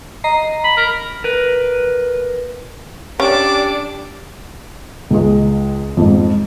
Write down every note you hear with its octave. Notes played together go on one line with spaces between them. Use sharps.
D#5 A#5 C7
B5
A#4
A#4 B4
C#4 D4 G4 A4 A5 D6
C#2 G#3
F2 G#2